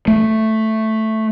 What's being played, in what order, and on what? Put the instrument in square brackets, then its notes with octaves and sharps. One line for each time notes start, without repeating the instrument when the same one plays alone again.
[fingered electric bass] A3